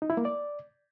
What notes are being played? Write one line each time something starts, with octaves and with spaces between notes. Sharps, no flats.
D#4
E4
A#3
D5